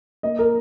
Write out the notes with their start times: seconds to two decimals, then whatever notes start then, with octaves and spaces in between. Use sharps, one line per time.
0.23 A#3 D#5
0.39 A#4